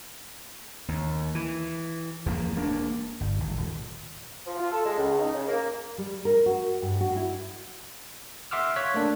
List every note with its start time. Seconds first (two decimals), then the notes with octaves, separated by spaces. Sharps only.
0.88 D#2
1.35 E3
2.26 E2 F3 A#3
2.55 E1 A#3 D4
3.20 G1
3.40 G#1
3.57 D#1
4.46 F3
4.58 F4
4.72 A4
4.84 G#3
4.97 C#2
5.19 D#4
5.34 C#3
5.47 A#3
5.98 G3
6.25 A#4
6.46 F#4
6.82 G2
7.01 F#4
7.16 E4
8.51 E5 F#5 C6 D6 E6 F6
8.76 C#5 F5 F#6 G#6 B6
8.94 A3 A#3 D4